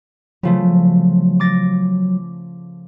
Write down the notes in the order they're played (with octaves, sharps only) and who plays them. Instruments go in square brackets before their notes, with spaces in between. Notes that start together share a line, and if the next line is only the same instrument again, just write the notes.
[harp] C#3 F3 A3 [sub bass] F#3
[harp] D6 A6 A#6